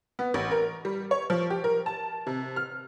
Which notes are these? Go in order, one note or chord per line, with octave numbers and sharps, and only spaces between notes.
B3
A1
A#4
G3
C#5
F3
G4
A#4
A5
C3
F6